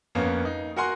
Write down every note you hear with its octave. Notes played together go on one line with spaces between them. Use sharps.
F2 A#3 B3 C#4
D#4
F#4 A#4 F#5 G#5 C6